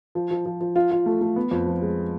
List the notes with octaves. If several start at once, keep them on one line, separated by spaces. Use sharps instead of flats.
F3
F3
F3
F3
F4
F4
A3
A3
B3
F2
F3
G#3